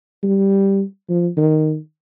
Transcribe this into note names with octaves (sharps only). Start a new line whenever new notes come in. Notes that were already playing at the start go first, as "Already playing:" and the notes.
G3
F3
D#3